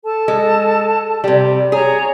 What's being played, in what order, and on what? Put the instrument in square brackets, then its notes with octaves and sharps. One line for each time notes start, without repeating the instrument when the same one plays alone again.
[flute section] A4 A5
[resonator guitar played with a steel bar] G#3
C3 G3
[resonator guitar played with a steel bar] G#4 [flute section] C#5 G#5 A#5